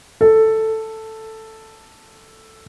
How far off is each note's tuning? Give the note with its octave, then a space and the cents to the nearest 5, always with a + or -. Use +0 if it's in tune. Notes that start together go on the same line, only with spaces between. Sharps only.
A4 +5